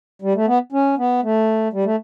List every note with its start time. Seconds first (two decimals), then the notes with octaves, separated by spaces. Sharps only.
0.22 G3
0.35 A3
0.47 B3
0.72 C#4
0.98 B3
1.23 A3
1.73 G3
1.85 A3